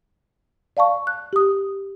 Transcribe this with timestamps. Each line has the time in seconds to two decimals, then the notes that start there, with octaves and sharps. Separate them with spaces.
0.77 D5 F5 A5 C#6
1.07 F#6
1.33 G4 D#6